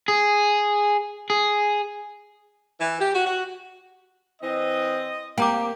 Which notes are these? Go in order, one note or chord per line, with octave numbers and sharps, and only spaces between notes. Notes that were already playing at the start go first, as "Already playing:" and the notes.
G#4
G#4
E3
G4
F#4
F#4
E3 C4 D#5
A#3 C4 G4 G5 A#5 D6